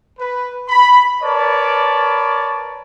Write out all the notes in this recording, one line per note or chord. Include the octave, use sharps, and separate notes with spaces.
B4
B5
A#4 B4 C#5 D5 A5